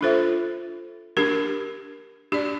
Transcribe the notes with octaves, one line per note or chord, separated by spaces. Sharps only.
D4 F4 A4 C5 E5
D4 G4 A#4
D4 G4 D5